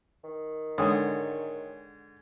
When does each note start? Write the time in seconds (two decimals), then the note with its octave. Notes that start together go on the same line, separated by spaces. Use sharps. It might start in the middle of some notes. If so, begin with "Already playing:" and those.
0.24 D#3
0.78 G#2 D3 C#5 G5 G#5 D#6